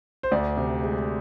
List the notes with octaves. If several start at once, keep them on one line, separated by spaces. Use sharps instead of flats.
C5
D2 D5
C3
G#3